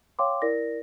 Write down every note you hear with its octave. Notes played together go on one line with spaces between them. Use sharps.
C#5 F5 G5 C6 D6
E4 A#4 D5 A#6